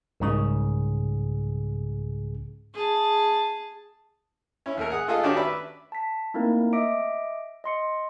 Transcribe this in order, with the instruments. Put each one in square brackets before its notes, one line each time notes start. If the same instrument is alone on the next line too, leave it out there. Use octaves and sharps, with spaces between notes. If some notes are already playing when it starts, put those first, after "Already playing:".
[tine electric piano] C2 G#2 C#3 G#4
[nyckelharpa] G#4 A5
[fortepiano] C#4 E4
D#2 A3 A#4
G#4 F#5 D#6
A3 F4 G#4 A4 D#5 F5
D#3 C#4 D4 F#4 G4 D5
B4 D5 E5
[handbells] A5 B6
A3 A#3 C4 D#4 E4 A#4
D#5 E5 D6 D7
D#5 C6 C#7